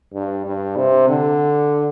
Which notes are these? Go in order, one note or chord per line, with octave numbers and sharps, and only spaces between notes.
G2
G2
C3
D3